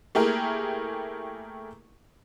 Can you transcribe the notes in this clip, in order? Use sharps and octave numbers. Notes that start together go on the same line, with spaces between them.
A3 A#3 E4 G4 G#4 A#4